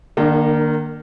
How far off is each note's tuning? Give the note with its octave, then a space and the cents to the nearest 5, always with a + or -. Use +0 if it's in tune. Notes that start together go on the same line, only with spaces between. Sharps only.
D#3 -35 A#3 +0 D4 +20